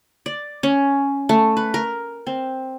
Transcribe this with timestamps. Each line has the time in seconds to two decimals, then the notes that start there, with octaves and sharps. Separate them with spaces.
0.26 D5
0.63 C#4
1.29 A3
1.57 B4
1.74 A#4
2.27 C4